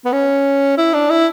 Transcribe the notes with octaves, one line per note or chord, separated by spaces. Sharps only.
B3
C#4
E4
D4
E4